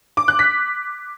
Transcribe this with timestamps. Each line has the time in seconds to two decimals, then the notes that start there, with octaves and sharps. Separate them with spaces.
0.17 D6
0.28 F#6
0.39 B6